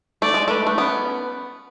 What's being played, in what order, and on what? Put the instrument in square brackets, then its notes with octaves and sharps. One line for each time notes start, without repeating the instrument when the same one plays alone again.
[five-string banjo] A3 [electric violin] D5
[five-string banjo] G#3
[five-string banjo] A3 [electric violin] B4
[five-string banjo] A3
[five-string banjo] B3 [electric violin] C#4